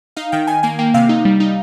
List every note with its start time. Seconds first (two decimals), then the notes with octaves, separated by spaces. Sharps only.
0.17 D#4 F5
0.32 D#3 G5
0.47 D#3 G#5
0.63 A#3 G#5
0.79 A#3 G5
0.94 C3 F5
1.09 D#4
1.25 G3
1.40 D#4